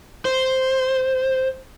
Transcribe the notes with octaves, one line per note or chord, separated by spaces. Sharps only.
C5